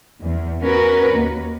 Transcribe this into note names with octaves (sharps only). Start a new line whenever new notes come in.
E2
C#4 F#4 A#4 B4
D#2